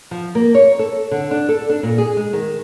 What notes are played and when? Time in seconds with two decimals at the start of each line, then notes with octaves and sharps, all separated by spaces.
0.11 F3
0.35 A#3
0.55 C#5
0.79 A4
1.11 D3
1.31 D4
1.49 A4
1.69 D4
1.83 A#2
1.98 G#4
2.17 G#3
2.33 D#3